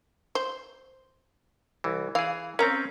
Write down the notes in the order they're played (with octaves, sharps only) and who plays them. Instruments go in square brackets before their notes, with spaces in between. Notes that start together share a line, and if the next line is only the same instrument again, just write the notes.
[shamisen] C5
[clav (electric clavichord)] C2 E3
[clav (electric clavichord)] E3 G#4 [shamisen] F5
[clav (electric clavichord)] C4 C#4 [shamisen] A#4 A#5